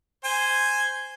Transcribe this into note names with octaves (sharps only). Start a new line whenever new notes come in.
C5 G#5